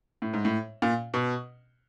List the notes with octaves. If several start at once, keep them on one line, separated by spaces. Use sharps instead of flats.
A2
G#2
A2
A#2
B2